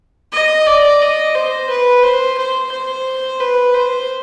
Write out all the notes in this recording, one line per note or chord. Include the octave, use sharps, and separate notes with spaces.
D#5
D5
D#5
C5
B4
C5
C5
C5
B4
C5